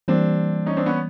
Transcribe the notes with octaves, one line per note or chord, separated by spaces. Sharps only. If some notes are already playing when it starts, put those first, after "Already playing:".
E3 G3 A#3 C4 D4
C#4 D#4
C4 D4
B3 C#4